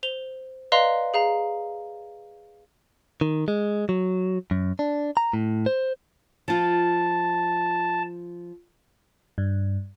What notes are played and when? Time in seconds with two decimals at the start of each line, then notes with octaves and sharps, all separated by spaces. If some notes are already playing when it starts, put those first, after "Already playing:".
0.03 C5 F7 G7
0.72 B4 D5 D#5 F5 A#5 C6
1.14 G#4 F5 A#5
3.21 D#3
3.48 G#3
3.89 F#3
4.51 F#2
4.79 D4
5.17 A#5
5.33 A2
5.66 C5
6.48 F3 F4 A5
9.38 G2